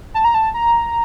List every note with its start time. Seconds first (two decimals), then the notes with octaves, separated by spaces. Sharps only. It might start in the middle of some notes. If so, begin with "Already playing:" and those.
0.14 A5
0.24 A#5
0.34 A5
0.54 A#5